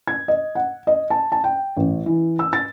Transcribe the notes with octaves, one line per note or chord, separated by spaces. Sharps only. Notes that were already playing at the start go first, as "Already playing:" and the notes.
G#6
D#5
F#5
D#5
A5
A5
G5
A1
E3
E6
A6